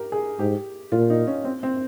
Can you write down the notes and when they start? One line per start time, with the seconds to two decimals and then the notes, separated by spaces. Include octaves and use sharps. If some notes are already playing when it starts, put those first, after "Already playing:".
Already playing: G4 A#4
0.12 G#4
0.39 G#2 G4
0.92 A#2 F4
1.10 D#4
1.27 C#4
1.45 C4
1.63 C4